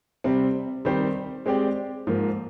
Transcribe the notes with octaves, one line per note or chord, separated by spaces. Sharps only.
C3 G3 C4
D#3 G3 C4 G4 C5
G#3 C4 G4 D5
G#2 F3 A#3